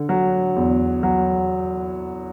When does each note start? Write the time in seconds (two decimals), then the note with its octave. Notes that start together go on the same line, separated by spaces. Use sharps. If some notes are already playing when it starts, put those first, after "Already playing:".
Already playing: D3
0.09 F#3
0.56 E2
1.03 F#3